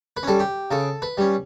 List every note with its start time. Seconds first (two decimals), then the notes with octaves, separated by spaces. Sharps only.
0.17 B4
0.23 G3 C#4 A4
0.39 G4
0.71 C#3 A4
1.02 B4
1.17 G3 C#4